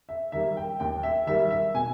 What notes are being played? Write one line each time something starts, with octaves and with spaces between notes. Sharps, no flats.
E5
D#3 G3 A#3 E5
G5
D#2 G5
E5
D#3 G3 A#3 E5
E5
B2 G#5